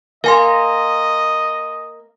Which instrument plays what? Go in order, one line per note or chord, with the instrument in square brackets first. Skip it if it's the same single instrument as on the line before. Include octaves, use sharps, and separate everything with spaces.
[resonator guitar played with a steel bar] A#3 [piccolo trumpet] D#5 [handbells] F5 G#5 C6